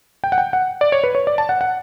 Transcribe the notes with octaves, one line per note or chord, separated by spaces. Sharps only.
G5
F#5
G5
F#5
D5
C#5
B4
C#5
D5
A5
F#5
F#5